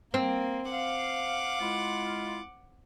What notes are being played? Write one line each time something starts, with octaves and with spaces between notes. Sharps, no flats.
A#3 C4
F5 F#5 D6
G#3 E4 F4